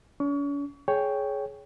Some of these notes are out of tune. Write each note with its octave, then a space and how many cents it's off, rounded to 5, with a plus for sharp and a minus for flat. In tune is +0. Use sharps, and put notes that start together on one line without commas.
C#4 +45 C#6 +35
G#4 +20 C#5 +10 G5 +0